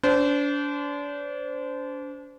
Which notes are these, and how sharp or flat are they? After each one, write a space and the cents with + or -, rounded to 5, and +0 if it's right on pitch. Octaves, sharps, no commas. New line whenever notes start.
D4 -35 C5 -25